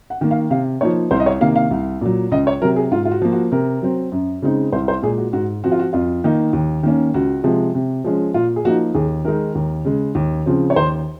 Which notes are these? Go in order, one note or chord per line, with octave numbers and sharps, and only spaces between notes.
F#5
D#3 A#3
F5
C3 F5
F3 A#3 D#4 C#5
C2 C5
D#5
C#5
C3 D#3 A#3 F5
F5
C2
A#2 F#3
C#2 D#5
C#5
C3 F#3 A#4
G#4
G#2 F4
F4
F#4
F3 A#3
F#4
C3 A#4
F#3 C4
F#2
C#3 G#3 C4 D#4
C2 C5
C5
A#2 G#3 G#4
F#4
G#2 F#4
F3 C4 F#4
F4
F#4
F2 F4
D#3 A#3 D#4
D#2
D#3 A#3 C#4
C#2 F#4
C3 F3 G#3
C3
F3 G#3 C#4
A#2 F4
G#4
F3 A#3 D#4 F#4
D#2 G#4
D#3 G#3 D#4 A#4
D#2
C#3 G#3
D#2
C#3 F3 C4
C#5
D#2 C5